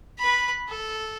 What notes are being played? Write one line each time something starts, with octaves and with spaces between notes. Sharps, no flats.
B4 B5
A4